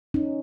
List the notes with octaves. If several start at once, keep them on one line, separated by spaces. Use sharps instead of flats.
C#4 D#4